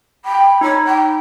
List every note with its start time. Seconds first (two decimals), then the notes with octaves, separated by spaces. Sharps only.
0.25 G5 B5
0.61 D#4 C#5
0.85 G5